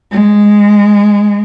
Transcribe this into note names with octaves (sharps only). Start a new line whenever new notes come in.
G#3